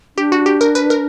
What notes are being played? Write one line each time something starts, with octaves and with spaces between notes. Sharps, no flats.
D4 G4
F#4
G4
A#4
B4
A#4